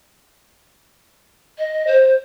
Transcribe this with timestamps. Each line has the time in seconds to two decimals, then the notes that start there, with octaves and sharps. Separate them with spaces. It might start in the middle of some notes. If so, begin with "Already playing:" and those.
1.58 D#5
1.87 C5